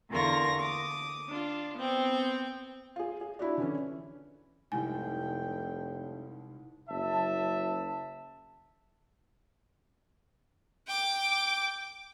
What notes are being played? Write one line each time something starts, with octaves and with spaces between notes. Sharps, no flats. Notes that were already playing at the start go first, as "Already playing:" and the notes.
E2 D3 F4 A#4 C#6 A#6
D6 D#6
D4 F4
B3 C4 G5
F4 G#4
G#4
D4 E4 F#4 D5
D3 E3 C#4
F1 C2 G#2 G5 G#5
F#1 E5 A5
G5 D6